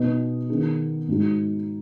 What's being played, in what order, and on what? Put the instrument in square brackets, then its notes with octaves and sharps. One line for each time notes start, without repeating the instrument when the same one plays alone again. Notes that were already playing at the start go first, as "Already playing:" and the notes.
Already playing: [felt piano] B2 B3 D#4 B4 D#5
D#3 B3 D#4 G#4
G#2 G#3 D#4 F#4